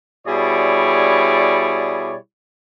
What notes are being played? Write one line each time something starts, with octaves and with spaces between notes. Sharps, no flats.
B2 G3 E4 G#4 C#5 D5